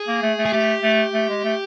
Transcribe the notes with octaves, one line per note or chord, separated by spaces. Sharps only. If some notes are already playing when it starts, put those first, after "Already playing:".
Already playing: G#4
A#3
A3
A3
G#4
A3 G4
A3
A3
G#3
A3